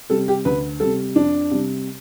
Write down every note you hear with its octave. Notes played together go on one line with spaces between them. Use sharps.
C3 G3 A4
G4
D2 B4
C3 G3 A4
F2 D4
C3 G3